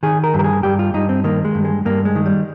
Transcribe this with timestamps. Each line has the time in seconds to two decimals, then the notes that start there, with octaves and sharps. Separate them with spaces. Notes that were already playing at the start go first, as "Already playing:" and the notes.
0.03 D#3 G#4
0.24 A#4
0.34 G2
0.39 A#4
0.44 G#4
0.63 G2 G4
0.79 F4
0.94 G2 D#4
1.09 C4
1.24 D#3 A#3
1.45 G#3
1.55 G2
1.65 G#3
1.85 G2 A#3
2.05 G#3
2.15 D#3
2.26 G3